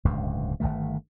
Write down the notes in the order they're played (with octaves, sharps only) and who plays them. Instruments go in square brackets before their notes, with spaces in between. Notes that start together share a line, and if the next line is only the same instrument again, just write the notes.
[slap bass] D1 C#2 G2
G1 C2 D#3 A3